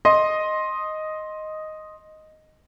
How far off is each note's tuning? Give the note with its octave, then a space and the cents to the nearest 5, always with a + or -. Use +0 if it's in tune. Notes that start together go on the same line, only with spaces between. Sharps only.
D#5 +0 C6 +10